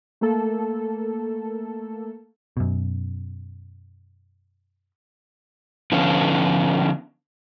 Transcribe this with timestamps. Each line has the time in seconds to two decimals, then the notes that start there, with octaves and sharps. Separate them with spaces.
0.21 A3 A#3 A4
2.57 F#2 B2
5.92 D3 F3 B3 C#4